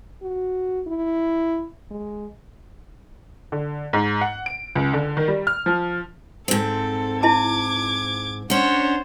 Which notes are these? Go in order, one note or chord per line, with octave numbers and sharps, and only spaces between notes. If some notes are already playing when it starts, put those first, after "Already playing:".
F#4
E4
G#3
D3
G#2
F#5
D7
C#2
D3
D#3
G3
F6
F3
G#2 C4 A4
E4 D#5 A5 D6 G#6
C#4 D4 C5 C#5 F#5